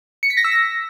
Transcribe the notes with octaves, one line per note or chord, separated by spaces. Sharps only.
C#7
B6
A#6
E6
A#6